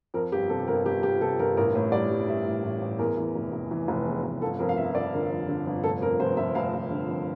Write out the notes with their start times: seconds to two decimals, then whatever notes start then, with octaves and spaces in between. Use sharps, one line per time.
0.14 F2 A#4
0.32 G1 G4
0.49 C3 A4
0.67 G1 A#4
0.85 G1 G4
1.03 G1 G4
1.21 C3 A4
1.39 G1 A#4
1.57 A1 A#4
1.75 A2
1.92 G3 D5
2.10 G3
2.27 G3 E5
2.46 A1
2.64 A1
2.82 A1
2.99 E2 A#4
3.17 E3
3.35 F1
3.52 F1
3.71 E3
3.88 F1
4.06 E2
4.23 F1
4.41 G1 A4
4.59 F2 A#4
4.69 F5
4.77 G1 E5
4.95 G1 D5
5.13 D3 A#4
5.30 F2
5.49 D3
5.66 G1
5.84 F1 A4
6.02 F2 A#4
6.20 F1 C5
6.37 F1 E5
6.55 F1 F5
6.74 F1
6.91 D3
7.08 F2